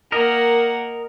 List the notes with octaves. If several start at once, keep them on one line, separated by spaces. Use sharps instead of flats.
A#3 A#4 D#5 F#5